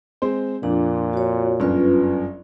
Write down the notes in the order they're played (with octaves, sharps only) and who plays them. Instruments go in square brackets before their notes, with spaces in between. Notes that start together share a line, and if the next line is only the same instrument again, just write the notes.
[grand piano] G#3 C4 C5
[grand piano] F2 F3 [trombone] A#2 [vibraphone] D4
[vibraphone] F#4 C#5
[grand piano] G1 F#2 [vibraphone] C#4 F4 B4